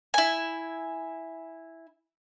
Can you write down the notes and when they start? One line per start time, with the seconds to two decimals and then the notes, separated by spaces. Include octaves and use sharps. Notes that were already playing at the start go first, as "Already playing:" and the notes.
0.14 E4 G#5